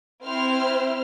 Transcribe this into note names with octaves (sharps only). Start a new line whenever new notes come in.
C4 E4 C5 F6